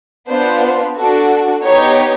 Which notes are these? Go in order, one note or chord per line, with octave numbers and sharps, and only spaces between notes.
B3 D4 F4 C5
D4 F#4 A4
B3 D#4 G4 C#5